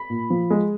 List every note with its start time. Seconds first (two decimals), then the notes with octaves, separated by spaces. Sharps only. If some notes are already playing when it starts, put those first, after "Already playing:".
Already playing: B5
0.10 A#2
0.30 F3
0.51 G#3